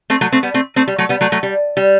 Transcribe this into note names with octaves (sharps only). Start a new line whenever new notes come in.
A3 C4
F#3 A3
A3 C4
G3 B3
A3 C4
A3 C4
G3
F#3 A3
G3 B3
F#3 A3
F#3 A3
G3
G3